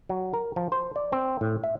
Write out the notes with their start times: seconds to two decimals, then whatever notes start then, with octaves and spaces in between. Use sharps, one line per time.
0.09 F#3
0.33 A#4
0.56 F3
0.72 C5
0.96 D5
1.12 C4
1.41 A2
1.64 E5